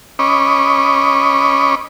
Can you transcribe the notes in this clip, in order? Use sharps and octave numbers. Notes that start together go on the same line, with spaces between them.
C#4 D#5 B5 C#6 D6